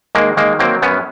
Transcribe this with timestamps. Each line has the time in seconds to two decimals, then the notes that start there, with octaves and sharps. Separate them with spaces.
0.15 D#3 G#3 A#3
0.37 D#3 G#3 A#3
0.59 F#3 A#3 C4
0.82 F#2 B3 C#4